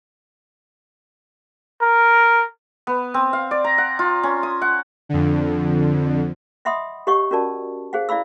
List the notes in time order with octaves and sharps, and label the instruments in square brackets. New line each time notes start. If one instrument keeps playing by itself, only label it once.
[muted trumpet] A#4
[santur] B3
C4
F5
D5
A#5
F#5
F4
C#4
D#6
F#5
[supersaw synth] F2 D3
[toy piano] D#5 E5 F#5 B5 C6 D#6
G4 C#5 D#5 F#5 C#6
C#4 F#4 A#4 D5 A5
G#4 C5 F5 F#5
E4 D5 F5 B5 E6